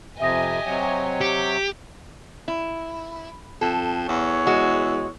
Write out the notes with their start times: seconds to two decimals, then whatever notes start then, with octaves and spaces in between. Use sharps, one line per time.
0.20 F2 C3 G4 D#5 E5 G#5 D#6 A#6
0.66 C3 F#3 C#5
1.21 G4 C#7
2.48 E4
3.61 F2 A4
4.09 E2 C#5
4.47 G#3 F#4